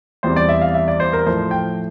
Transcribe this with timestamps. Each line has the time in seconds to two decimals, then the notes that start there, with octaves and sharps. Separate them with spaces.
0.23 E2 E3 G3 C4 C5
0.36 D5
0.49 E5
0.61 F5
0.74 E5
0.88 D5
1.00 C5
1.13 A#4
1.26 A2 F3 A3 C5
1.51 G5